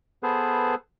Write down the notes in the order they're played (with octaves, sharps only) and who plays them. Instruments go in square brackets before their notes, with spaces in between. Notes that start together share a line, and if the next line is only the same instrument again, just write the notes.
[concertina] B3 G#4 A4 B4 C5